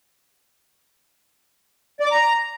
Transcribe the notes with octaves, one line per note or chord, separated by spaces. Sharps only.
D5
D6
A#5